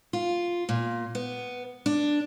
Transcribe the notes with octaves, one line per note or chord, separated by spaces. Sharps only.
F4
A#2
B3
D4